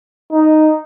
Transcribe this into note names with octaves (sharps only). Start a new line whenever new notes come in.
D#4